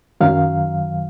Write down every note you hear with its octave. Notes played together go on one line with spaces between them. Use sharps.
F#2 D#3 F#3 F5